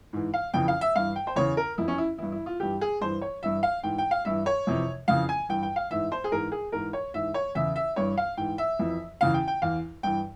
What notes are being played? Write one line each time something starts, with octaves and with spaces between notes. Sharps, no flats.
G#2 E3
F5
F2 C#3 E3 G5
F5
E5
G2 E3 F5
G5
C5
E2 C#3 E3 C#5
A#4
F2 E3 E4
C#4
E4
G2 E3 E4
E4
F4
G2 E3 G4
G#4
G2 E3 C5
C#5
G2 E3 E5
F5
G#2 E3 G5
G5
F5
G2 E3 E5
C#5
F2 C3 E3
F2 C#3 E3 F5
G#5
G2 E3 G5
G5
F5
G#2 E3 E5
C5
G#4
G#2 E3 A#4
G#4
G#2 E3 A#4
C#5
G#2 E3 E5
C#5
E2 C#3 E3 E5
E5
G2 E3 C#5
F5
G#2 E3 G5
E5
F2 E3
E2 C#3 E3 F5
G5
G5
E2 E3 F5
G2 E3 G5